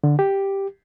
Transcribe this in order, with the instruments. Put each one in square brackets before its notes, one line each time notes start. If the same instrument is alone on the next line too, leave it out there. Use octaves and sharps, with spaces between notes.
[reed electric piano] D3
G4